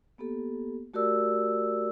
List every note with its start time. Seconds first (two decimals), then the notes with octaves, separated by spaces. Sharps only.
0.18 A#3 B3 G4 A4
0.94 A3 F#4 G4 A#4 D5 E6